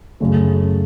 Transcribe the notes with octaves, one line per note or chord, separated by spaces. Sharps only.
F#2 C#3 A3